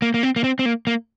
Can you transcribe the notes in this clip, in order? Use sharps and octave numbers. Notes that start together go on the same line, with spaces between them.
A#3
A#3
C4
A#3
C4
C4
A#3
A#3